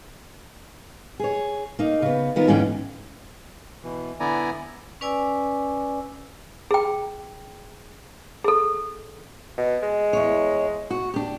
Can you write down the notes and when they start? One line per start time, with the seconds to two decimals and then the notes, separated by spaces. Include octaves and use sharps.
1.19 G#4 C#5
1.79 A#3 D#4
2.02 C#3 B3
2.36 D#3 B3 F4 A#4
2.47 D#2 G#2 D3 E3 C#4 G5
3.83 B2 E3
4.20 D3 B3 E4 D5 G#5 A#5
5.01 C#4 B4 D5 G#5 D6 E6
6.71 G#4 G5
8.44 G#4 A4
9.58 B2
9.83 G#3
10.13 E2 C#5
10.90 F#4
11.14 D4 G4